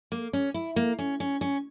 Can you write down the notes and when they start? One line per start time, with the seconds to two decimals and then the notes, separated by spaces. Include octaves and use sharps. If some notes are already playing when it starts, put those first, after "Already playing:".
0.12 A#3
0.33 C#4
0.54 E4
0.76 A#3
0.99 C#4
1.20 C#4
1.41 C#4